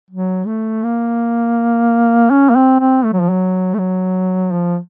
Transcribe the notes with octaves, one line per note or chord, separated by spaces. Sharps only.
F#3
A3
A#3
C#4
A#3
C4
C4
A3
F#3
F3
F#3
A3
F#3
F3